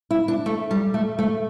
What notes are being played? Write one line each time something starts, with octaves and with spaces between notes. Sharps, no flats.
E4
D4
A3
G3
A3
A3